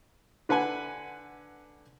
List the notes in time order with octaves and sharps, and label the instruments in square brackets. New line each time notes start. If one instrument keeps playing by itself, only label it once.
[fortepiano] D3 B4 F#5 G#5